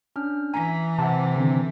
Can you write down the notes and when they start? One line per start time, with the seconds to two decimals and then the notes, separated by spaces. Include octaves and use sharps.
0.16 C#4 D4 F6
0.54 E3 G#5 A#5
0.99 C3 F#5 A5
1.36 D3 D#3 C4